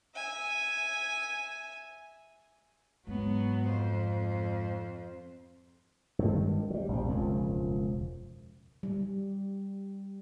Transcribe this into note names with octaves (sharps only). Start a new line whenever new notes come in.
E5 G#5
G#2 F#3 B3
F2 C5
G2 D#3 G#3
F#3 G3
A#1 C4
E1 C#2 F#2 F3
G3